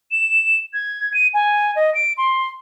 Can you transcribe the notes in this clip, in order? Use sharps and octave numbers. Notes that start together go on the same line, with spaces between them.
E7
G#6
D#7
G#5
D#5
D7
C6